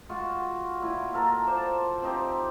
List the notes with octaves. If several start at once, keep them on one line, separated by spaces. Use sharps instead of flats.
G#3 F4 F#4
A#2 E4
F4 A4 A#4 A#5
C5 D5 A5
C4 D#4 G4